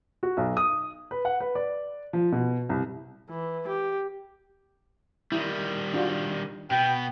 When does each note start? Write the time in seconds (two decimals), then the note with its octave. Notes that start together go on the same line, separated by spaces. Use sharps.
0.23 F#4
0.37 B1
0.57 D#6
1.11 B4
1.25 F#5
1.40 B4
1.55 D5
2.13 F3
2.32 B2
2.69 C2
3.30 E3
3.68 G4
5.32 D#3 G3 E4
5.94 D4 F4 F#4
6.71 B2 B3 G5